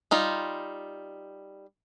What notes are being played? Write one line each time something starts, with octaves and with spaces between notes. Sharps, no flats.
G3 D#4 F4